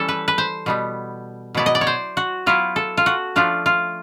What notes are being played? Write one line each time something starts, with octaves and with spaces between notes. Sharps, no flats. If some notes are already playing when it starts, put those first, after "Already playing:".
Already playing: E3 G3 C#4 A4
B4
B4
C5
B2 G3 B3
B2 F#3 B3 E4 D5
D#5
D5
C#5
C5
F#4
F#3 B3 E4 F4
A4
F4
F#4
F3 A3 D4 F4
F4